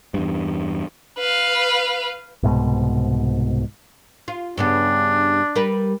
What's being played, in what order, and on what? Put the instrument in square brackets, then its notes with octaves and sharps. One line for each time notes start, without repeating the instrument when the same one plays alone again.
[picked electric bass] E2 G2
[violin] B4 F5
[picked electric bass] C2 G#2 B2
[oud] F4
[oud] G2 C#3 B3 [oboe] D4
[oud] G3 A#4 B4